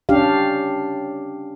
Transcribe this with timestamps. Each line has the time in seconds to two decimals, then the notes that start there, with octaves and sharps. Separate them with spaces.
0.09 C#4 D4 G4 F5